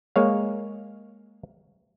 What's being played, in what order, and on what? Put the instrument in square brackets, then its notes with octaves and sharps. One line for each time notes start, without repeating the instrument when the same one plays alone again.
[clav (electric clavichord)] G#3 A#3 C#5 F5